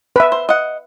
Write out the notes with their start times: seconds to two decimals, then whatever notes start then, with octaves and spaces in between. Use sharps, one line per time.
0.16 B4 E5 B5
0.32 C5
0.49 D#5 F#5